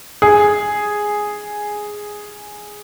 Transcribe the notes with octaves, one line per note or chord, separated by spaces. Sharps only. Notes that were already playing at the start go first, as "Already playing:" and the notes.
G#4